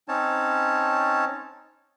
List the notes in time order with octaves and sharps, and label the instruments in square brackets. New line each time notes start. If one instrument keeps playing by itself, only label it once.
[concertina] C4 C#4 D#4 C#5 A5